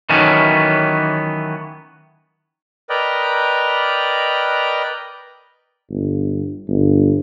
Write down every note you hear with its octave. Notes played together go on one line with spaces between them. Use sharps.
D#3 E3 F#3 A3 B3 C#4
A#4 B4 D5 D#5 G5
G1
G1